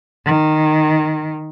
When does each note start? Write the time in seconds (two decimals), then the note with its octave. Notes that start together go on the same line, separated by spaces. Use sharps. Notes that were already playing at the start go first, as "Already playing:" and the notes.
0.25 D#3